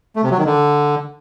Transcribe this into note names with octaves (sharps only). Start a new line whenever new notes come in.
A3
C3
F#3
D#3
D3